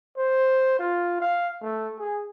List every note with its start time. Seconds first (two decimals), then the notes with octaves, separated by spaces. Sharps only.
0.17 C5
0.79 F4
1.21 F5
1.63 A3
1.99 G#4